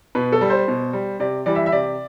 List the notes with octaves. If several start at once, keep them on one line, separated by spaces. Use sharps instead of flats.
B2 B4
A4
G3
C5
B2
G3
C3 D5
E3 G3 D5
E5
E5
C3 D5